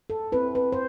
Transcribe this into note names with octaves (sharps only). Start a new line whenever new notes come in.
A4
C4 E4 B4
B4
C5